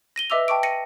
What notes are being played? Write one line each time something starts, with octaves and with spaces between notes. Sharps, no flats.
A#6 D#7 G7
B4 D#5 E5 D6 E6 F7
G5 A5 C#6 D6 D7
A#6 C#7 D#7